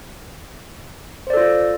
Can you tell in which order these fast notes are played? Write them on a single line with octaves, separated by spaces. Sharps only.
C5 D5 A4 F4